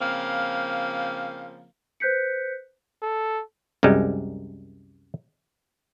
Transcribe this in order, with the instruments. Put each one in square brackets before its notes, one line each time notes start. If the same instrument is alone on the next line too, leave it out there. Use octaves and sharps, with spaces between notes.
[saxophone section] C#3 F3 A#3 C4 F5
[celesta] B4 C5 F#6 G6 B6 C#7
[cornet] A4
[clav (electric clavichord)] C2 F#2 G3 G#3